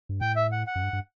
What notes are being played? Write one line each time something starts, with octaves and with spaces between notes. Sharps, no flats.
G2
A2 G5
E5
F#5
F#5
F#2
G2
G2